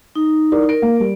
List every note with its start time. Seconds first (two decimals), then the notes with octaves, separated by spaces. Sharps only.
0.15 D#4
0.52 E4 A#4 D5
0.69 A#4 D7
0.82 A#3
1.00 G3